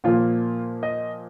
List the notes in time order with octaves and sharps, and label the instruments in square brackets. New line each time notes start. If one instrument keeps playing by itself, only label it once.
[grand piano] A#2 F3 A#3 F4
D#5